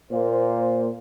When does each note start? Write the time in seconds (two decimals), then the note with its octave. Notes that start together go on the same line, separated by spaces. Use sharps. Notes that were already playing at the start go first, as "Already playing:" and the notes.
0.11 A#2 A#3 C5